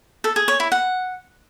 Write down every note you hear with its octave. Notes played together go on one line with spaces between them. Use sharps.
A4
G#4
C#5
E4
F#5